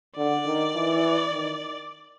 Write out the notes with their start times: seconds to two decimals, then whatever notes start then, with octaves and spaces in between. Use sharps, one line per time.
0.17 D3 D5
0.46 D#3
0.75 E3
1.32 D#3